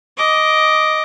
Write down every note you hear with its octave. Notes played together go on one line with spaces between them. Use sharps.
D#5 D6